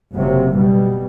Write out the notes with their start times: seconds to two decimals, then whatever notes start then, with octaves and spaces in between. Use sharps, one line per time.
0.14 F#1 C3 F#3
0.53 B2 G3